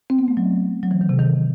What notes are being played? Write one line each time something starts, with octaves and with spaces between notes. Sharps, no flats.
C4
B3
A3
F#3
F#3
E3
D#3
C3
D#3